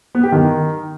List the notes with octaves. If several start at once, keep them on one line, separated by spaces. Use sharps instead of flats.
B3
G4
D#3